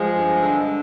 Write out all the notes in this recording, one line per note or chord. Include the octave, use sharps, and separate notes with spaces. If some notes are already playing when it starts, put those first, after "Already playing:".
Already playing: F3 G#3
G2
D3